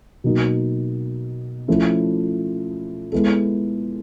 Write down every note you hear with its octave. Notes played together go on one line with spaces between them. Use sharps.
B2 F#3 A#3 D#4
F3 A3 C#4 E4 A4
G#3 B3 E4 A4